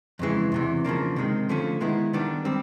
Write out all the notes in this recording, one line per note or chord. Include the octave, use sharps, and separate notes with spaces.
F2 C#3 E3 G#3
E2 C3 E3
C#3 F3 A#3 D4
C3 D#3 G#3
D3 F3 A3 C#4
D#3 G#3 B3 E4
D#3 G3 B3 D4
G3 C4